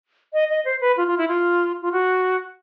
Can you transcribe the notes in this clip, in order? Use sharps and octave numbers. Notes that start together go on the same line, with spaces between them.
D#5
D#5
C5
B4
F4
F4
E4
F4
F4
F#4